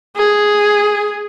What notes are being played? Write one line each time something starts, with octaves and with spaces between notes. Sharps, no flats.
G#4